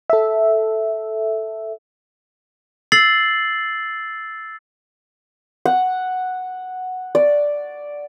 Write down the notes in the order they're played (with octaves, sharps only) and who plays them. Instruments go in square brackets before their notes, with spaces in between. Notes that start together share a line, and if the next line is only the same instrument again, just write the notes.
[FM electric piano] A4 E5
[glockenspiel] E6 A6 C7 F#7
[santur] F#5
D5